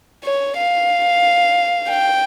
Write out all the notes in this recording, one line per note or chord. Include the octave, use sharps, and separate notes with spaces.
C#5
F5
G5